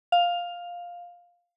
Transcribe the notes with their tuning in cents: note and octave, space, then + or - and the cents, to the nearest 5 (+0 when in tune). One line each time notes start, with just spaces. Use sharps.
F5 +10